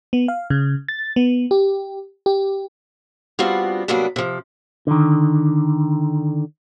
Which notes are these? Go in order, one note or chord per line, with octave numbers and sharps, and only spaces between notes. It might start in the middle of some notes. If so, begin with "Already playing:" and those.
B3
F5
C#3
A6
B3
G4
G4
G3 B3 C4 D4 F4 F#4
C3 F#3 G3 A#3 B3 D4
C3 F3
D3 D#3